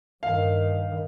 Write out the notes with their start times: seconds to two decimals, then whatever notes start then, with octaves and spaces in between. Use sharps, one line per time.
0.23 G2 D#3 F5